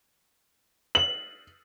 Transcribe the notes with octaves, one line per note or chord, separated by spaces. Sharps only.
F#7